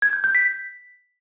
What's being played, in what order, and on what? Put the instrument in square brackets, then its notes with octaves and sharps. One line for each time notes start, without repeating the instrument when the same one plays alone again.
[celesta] G#6
G6
G6
B6